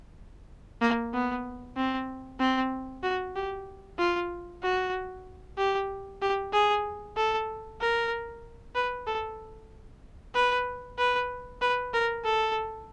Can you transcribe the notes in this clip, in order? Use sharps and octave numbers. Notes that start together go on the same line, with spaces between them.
A#3
B3
C4
C4
F#4
G4
F4
F#4
G4
G4
G#4
A4
A#4
B4
A4
B4
B4
B4
A#4
A4